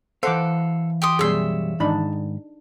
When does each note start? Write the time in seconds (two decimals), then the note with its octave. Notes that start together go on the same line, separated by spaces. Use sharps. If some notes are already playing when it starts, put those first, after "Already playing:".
0.23 E3 A4 C5 F5 F#5 D6
1.02 G4 C6 D#6
1.19 F#2 B2 G3 G#4 C#5 E5 C6
1.80 G#2 D#3 D4 D#4 B5